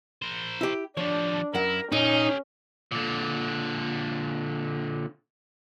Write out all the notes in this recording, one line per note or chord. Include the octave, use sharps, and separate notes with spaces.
A#4 C5
E4 G4
F3 G3 D4 C#5
F#2 E4 A#4 F#5
A#2 C#4 D#4 G4 G#5
A#2 D3